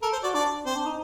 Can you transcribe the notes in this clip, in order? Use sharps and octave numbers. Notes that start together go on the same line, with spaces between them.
A4 A#4
C5
F#4 D5
D4 D5
C4 C5
D4
D#4